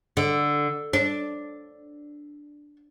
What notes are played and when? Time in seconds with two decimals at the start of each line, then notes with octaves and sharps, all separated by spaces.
0.17 D3
0.93 D4